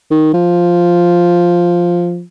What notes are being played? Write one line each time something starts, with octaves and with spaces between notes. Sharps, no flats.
D#3
F3